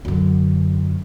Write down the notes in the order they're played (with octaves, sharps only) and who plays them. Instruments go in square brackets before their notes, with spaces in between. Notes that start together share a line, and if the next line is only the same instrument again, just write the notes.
[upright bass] F#2 D3